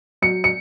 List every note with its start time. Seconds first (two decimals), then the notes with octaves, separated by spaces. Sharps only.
0.22 F#3 C#7
0.44 C#7